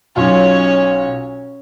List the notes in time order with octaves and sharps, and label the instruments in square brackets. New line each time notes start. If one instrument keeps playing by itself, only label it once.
[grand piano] B1 F4 [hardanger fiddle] C#4 C#5